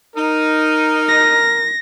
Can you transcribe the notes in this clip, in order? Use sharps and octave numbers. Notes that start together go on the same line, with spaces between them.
D#4 A#4
A#6